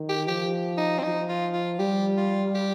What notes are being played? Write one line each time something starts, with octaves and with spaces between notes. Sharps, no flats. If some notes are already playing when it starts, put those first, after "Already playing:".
Already playing: D#3
G4
F3 G4
D#4
C4
F3 D#4
F4
F4
G3 G4
F4
G4